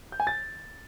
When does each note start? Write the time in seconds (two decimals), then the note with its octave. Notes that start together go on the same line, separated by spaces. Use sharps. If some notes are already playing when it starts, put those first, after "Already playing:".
0.12 G6
0.20 G#5
0.27 A6